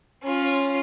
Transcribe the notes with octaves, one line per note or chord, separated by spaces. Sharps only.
C#4 F4